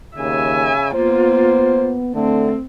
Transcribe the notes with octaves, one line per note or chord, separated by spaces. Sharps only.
D#2 C#3 E5 G#5
A#3 B3 F4 C5
D3 A3 C4